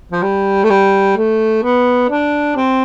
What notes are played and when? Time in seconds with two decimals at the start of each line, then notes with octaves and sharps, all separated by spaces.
0.12 F3
0.22 G3
0.64 A3
0.70 G3
1.16 A3
1.63 B3
2.09 D4
2.56 C4